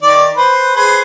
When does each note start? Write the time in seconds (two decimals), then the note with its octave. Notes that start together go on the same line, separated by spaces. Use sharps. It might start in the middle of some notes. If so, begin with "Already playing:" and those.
0.03 D#3 D5
0.37 B4 C5
0.76 G#4 B4 C5